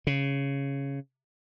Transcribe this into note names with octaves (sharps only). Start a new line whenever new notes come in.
C#3